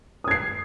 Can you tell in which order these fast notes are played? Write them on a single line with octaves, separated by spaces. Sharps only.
D#6 G#6 C7